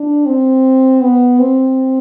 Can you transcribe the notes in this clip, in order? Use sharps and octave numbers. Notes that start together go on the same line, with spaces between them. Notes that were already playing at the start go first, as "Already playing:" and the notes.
Already playing: D4
C4
B3
C4